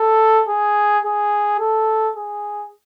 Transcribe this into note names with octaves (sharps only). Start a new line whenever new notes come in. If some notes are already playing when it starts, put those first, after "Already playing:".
Already playing: A4
G#4
G#4
A4
G#4